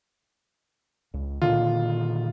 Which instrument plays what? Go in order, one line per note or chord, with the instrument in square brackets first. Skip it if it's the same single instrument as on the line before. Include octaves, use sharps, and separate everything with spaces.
[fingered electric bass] C#2
[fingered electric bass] A#2 D3 D#3 [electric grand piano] F4